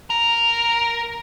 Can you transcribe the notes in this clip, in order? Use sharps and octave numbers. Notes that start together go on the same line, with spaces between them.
A#4